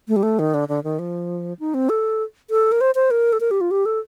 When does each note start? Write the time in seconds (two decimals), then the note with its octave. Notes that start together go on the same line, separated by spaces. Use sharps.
0.08 A3
0.16 G3
0.23 A3
0.39 D#3
0.54 D3
0.68 D3
0.84 D#3
0.99 F3
1.60 D#4
1.74 C4
1.89 A4
2.50 A4
2.72 A#4
2.81 C5
2.95 C5
3.11 A#4
3.33 A4
3.40 A#4
3.51 G4
3.61 F4
3.71 G4
3.86 A4